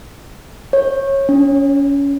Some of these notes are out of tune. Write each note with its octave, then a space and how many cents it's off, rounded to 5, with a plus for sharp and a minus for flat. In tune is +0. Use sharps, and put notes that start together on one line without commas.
C#5 -20
C#4 +20